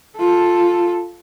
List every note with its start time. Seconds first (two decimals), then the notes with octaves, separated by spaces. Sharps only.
0.17 F4 A4